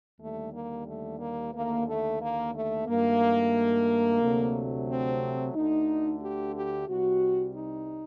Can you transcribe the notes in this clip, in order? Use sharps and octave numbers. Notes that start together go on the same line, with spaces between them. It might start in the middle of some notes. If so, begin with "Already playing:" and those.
D#2 D3 G3 A3
A#3
A3
A#3
D#2 D3 A3 A#3
A3
A#3
A3
G2 D#3 A3 A#3
D2 C3 F#3 A3
C4
D2 D3 A3 D#4
G4
G4
C2 C3 G3 F#4
D#4